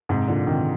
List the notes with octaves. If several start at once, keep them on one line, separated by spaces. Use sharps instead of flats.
G#2 C3
A#2 D3
C3 D#3